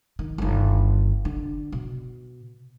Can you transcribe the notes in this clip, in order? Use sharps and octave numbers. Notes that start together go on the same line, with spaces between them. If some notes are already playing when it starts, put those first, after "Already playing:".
D#3
G1 D#3
D3
B2